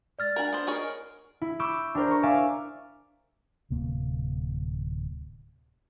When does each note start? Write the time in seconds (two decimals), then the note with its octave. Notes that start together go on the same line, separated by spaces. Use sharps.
0.19 G#3 D5 F6 A6
0.36 D4 A#4 F#5 G#5
0.53 B3 C5
0.67 D#4 G#4 A#4 C#5
1.41 E4
1.59 B5 C#6 D6 E6 G6
1.95 D4 G4 A#4 C5
2.08 A#5 C#6
2.23 D5 E5 F5 G#5 C#6 D6
3.70 D1 C3 A#3